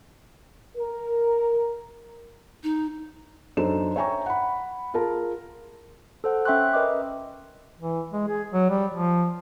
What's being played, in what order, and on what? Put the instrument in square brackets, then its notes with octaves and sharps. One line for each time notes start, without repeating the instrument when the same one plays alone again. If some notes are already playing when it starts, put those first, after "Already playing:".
[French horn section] A#4
[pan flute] D#4
[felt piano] F#2 D4 D#4 A4 C5 E7
C#5 E5 G5 G#5 A#5 C#6
F#5 B5
F4 G#4 A#4 A5
[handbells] A4 C5 F#5
C#4 E5 G5 C6 C#6 F#6
A#4 B4 D#5 E5 D6
[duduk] E3
G#3
G#4
F#3
G3
F3